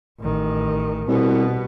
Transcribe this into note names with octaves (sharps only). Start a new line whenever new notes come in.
A1 D#3
C2 B2 B3